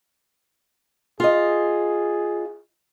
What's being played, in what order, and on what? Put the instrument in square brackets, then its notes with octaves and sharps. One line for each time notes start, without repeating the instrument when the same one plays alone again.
[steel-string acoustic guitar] F4 D#5 [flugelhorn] G#4